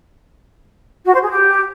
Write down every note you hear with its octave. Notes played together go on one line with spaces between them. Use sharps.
F#4
C5
G#4
G4